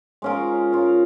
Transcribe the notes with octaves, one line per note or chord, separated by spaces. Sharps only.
G#3 C#4 F4 A#4
G#3 C#4 F4 A#4